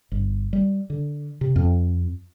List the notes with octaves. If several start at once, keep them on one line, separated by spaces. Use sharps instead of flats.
G1
G3
D3
C3
F2